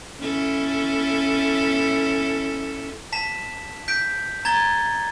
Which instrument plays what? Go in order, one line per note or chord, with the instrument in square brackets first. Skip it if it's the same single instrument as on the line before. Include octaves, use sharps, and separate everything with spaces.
[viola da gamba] C#4 E4 A4
[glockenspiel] A5 B6 E7
G6 B6 D7
A#5 G#6 A6 G7